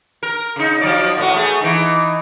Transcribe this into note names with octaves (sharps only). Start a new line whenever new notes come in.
A#4
C#3 D#4
F3 F#3 D5
A2 B3 F#4
A3 B3 G#4
E3 D#4